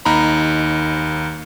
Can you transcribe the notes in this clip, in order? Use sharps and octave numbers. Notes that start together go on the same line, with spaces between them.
D#2 D#4 A#5 B5